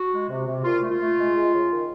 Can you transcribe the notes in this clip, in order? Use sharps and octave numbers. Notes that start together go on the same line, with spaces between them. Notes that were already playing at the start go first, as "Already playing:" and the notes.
Already playing: F#4
G#3
C3
C3
A#2 F4
A3
F4
A3
G#3
G#3
C#3
D#3